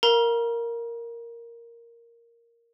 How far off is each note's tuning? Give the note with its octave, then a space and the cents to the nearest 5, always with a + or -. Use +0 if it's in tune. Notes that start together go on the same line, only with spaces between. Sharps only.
A#4 +0 F5 +0 A#5 +35